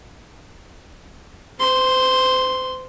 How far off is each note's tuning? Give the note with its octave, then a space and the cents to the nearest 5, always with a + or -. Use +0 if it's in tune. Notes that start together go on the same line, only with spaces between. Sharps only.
C5 -35 C6 +0